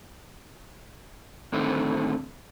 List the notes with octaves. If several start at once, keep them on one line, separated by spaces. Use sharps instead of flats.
A2 D3 D#3 A3 C4